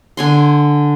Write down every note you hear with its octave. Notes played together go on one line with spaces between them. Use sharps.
D3 G#5 C6